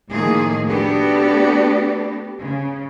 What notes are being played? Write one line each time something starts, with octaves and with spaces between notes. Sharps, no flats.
A2 D#3 F3 A3 A#3 G#4
A3 B3 D4 F#4 G4 A4
C#3